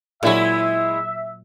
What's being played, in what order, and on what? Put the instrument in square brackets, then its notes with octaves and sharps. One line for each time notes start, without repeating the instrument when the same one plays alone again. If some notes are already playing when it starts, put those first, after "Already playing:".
[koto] A#2 F#3 [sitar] G#3 E4 G#4 [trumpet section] E5